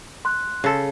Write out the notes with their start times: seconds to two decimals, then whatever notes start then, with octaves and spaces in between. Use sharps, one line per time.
0.25 C6 F#6
0.64 C#3 A4